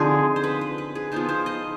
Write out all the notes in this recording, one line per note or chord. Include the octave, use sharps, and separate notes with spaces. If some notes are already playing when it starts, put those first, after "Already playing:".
Already playing: D3 F3 C4 D#4 G#4
C5
B4
B4
B4
G#4
F3 B3 D#4 C5
C5
D#5